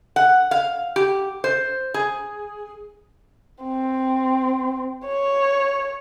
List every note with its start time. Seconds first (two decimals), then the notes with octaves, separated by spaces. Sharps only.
0.16 F#5
0.51 F5
0.96 G4
1.44 C5
1.94 G#4
3.63 C4
5.07 C#5